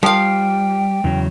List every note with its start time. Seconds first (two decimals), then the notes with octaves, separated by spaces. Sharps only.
0.03 F3 G3 F5 G5
1.04 E2 C#3 F#3